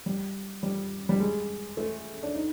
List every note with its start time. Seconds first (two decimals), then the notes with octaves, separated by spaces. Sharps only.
0.06 G3
0.63 G3
1.09 G3
1.20 G#3
1.77 A3
2.23 D4
2.34 D#4